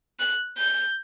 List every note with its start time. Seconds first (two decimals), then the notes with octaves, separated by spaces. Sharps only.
0.20 F#6
0.58 G6